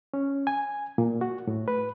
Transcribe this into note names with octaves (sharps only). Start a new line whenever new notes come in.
C#4
G#5
A#2
F#4
A2
B4